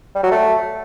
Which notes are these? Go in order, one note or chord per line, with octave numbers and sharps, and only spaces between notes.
G3
F#3
A3